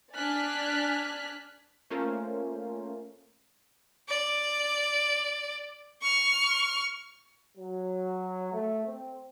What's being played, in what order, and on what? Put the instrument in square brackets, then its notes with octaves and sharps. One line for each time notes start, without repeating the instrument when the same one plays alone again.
[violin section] D4 D5 G#5 F6 F#6 B6
[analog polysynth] A3 A#3 C#4 F4 A#4 C5
[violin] D5
C#6 F6
[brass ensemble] F#3
A3
C4